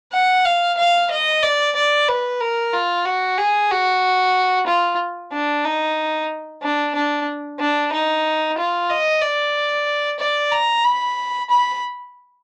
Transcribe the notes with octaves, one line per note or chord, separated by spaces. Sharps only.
F#5
F5
F5
D#5
D5
D5
B4
A#4
F4
F#4
G#4
F#4
F4
D4
D#4
D4
D4
D4
D#4
F4
D#5
D5
D5
A#5
B5
B5